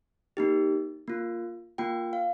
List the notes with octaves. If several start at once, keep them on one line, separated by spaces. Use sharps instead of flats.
A#3 D#4 G4
A#3 F4
A#3 F4 G5
F5